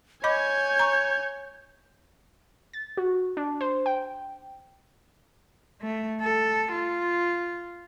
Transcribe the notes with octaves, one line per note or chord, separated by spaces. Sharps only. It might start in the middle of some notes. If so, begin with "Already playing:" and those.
C#5 D#5 G#5 B5 D6 G6
A#5 C#6
A6
F#4
D4
C5
G5
A3
A4
F4